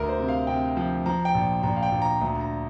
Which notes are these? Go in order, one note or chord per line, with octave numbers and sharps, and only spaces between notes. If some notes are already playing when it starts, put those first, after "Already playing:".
Already playing: D2 A#4
C5
C3
F5
C3 G5
F3
F3 A#5
G5
A#1
A#1 A#5
F5
G5
A#1
A#5
D2 A#5
A#5